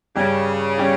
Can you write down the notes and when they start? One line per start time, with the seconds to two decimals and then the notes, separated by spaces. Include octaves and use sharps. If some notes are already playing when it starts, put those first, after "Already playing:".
0.16 G2 C#3 G3 C#4 G4
0.78 G3 C#4 G4